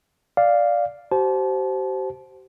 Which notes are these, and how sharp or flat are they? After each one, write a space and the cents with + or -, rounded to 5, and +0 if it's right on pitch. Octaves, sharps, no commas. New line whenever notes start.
D5 +0 F5 +0
G4 -45 C5 -5 A5 -30